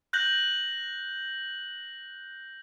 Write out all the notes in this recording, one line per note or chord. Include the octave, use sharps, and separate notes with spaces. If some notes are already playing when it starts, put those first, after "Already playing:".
F#6 G6 A#6 F#7